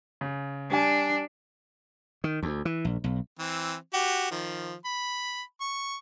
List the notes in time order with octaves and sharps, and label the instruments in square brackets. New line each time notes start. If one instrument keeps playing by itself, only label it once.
[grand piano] C#3
[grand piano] G3 G#5 [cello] D4
[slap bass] D#3
D2
E3
A#1
B1
[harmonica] E3 C4
F#4 G4
D#3 F3
B5
C#6